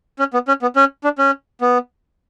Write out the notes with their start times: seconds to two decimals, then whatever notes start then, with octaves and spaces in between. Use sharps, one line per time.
0.19 C#4
0.33 B3
0.48 C#4
0.62 B3
0.76 C#4
1.04 D4
1.18 C#4
1.61 B3